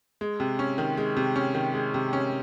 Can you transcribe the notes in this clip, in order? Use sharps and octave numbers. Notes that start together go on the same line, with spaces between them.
G#3
C3
C#4
D#3
G#3
C3
C#4
D#3
G#3
C3
C#4